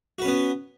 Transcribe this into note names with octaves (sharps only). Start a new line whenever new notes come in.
B3 C#4 F#4 B4